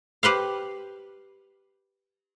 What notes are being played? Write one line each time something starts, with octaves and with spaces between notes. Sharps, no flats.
G4 B4 C5 F5